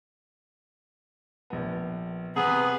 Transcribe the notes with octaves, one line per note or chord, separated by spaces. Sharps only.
A#1 B3
C3 B3 G#4 B4